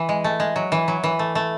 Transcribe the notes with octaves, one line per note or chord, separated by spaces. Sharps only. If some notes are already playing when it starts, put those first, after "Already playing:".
Already playing: E3
G#3
A3
G#3
F#3
E3
F#3
E3
A3
A3